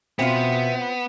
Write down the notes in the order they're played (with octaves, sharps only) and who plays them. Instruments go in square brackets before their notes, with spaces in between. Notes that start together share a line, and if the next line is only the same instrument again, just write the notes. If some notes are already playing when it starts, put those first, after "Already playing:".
[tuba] B2 [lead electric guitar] B3 [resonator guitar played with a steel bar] C4 F4 [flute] E5